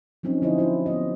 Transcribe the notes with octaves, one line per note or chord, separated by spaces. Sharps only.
F3 F#3 C4 C#4 D#4
D3 F3 D#4 E4 C5 D#5
D#4 E4 F#4 C5
B3 E4 D#5